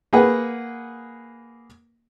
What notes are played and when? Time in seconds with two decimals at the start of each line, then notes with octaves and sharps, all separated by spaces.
0.13 A#3 G#4 B4 F#5